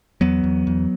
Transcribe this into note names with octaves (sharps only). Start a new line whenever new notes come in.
E2 F#3 B3
E2
E2